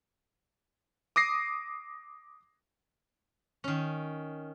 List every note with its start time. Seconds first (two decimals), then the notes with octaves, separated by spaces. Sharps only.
1.16 D6 D#6 A#6 C7
3.64 D#3 C#4